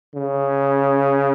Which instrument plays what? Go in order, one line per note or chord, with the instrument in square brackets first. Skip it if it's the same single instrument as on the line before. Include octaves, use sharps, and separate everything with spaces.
[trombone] C#3